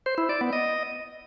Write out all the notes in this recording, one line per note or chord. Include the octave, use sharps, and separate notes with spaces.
C5
E4
D5
B3
D#5